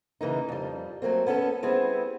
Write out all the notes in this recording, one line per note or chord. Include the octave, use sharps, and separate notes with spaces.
C#3 E3 A#3 D#4
F2 G3
F#3 A3 A#3 C4
B3 C#4 E4 A4
G3 B3 C4 E4 G#4